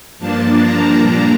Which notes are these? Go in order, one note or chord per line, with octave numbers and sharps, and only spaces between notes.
G2 F3 A#3 D4 A5
A#5
A#2 G3 A#3 D4